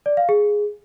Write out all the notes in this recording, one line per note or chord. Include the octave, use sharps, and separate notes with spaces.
D5
F5
G#4